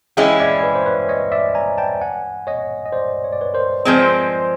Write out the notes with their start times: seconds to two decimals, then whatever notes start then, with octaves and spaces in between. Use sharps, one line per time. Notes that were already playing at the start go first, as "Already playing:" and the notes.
0.17 E3 G#3 C#4 E4 F5 G5
0.40 D5 E5
0.63 B4
0.75 C5
0.86 B4 C#5
1.09 C#5 D#5
1.32 D5 E5
1.55 G#5 A#5
1.78 G5 A5
2.01 F#5 G#5
2.47 C#5 D#5
2.86 D#5
2.93 C5 D5
3.24 C#5
3.33 D5
3.41 B4 C#5
3.54 A#4 C5
3.85 F3 G#3 C4